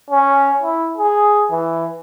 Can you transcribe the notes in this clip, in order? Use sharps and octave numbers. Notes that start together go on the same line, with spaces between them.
C#4
E4
G#4
E3